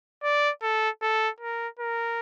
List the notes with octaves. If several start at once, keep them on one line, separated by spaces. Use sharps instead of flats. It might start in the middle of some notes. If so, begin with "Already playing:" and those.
D5
A4
A4
A#4
A#4